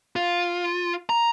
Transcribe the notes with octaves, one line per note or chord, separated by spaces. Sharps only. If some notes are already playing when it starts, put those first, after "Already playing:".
F4
A#5